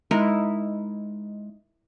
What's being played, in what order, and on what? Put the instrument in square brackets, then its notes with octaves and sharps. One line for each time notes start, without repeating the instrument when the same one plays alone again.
[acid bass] G#3 [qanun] D#4 E4 A#4